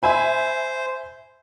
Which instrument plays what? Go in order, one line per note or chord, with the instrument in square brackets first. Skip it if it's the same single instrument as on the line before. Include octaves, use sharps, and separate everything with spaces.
[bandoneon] C5 [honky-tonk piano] E5 G#5 B5